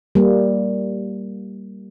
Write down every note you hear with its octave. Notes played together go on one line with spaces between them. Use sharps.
G3 A#3